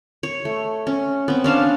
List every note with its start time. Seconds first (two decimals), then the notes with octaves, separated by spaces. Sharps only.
0.23 C#5
0.45 A3
0.87 C#4
1.28 B3 C4
1.44 C#4 D4 F5 A5